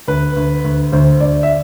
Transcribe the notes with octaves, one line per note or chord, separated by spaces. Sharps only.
D2 B4
D2
D2
D2 C5
D2 D5
E5